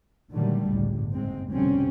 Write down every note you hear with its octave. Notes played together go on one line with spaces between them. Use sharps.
A#2 D3 D#3 F#3 G3 A3
G1 C#2 A2 D3
F#1 G#2 G#3 C4
F1 B2 D3 G3 C4 C#4